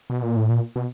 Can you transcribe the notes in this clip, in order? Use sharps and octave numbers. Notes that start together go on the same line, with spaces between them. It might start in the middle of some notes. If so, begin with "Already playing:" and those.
B2
A#2
A2
A#2
B2